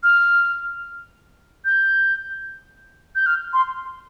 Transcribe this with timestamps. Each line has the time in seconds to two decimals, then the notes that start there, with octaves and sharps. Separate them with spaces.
0.03 F6
1.65 G6
3.15 G6
3.26 F6
3.53 C6